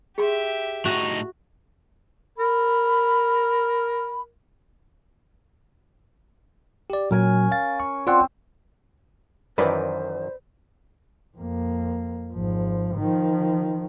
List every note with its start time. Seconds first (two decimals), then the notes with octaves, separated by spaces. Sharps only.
0.18 G4 G#4 E5 C6
0.85 A2 D#4 F#4
2.38 A#4 B5
6.90 G4 D5
7.11 A#2 F#3 C#4 A#4 G#5
7.52 F5 A6
7.80 C#6
8.07 C4 F4 C5 D5 F#5
9.58 F#2 D#3 E3 B4 C5 D5
11.37 F2 A#3
12.33 G#1 F3
12.96 D#3 F3